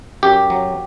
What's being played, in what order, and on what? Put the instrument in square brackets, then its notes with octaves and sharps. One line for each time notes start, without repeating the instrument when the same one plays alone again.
[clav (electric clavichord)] F#2 G4
F#3